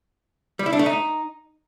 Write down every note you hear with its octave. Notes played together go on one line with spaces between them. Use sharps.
G3
E4
D4
A3
D#4